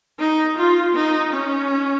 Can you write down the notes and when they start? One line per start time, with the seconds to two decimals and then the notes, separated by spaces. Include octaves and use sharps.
0.20 D#4
0.57 F4
0.95 D#4
1.32 C#4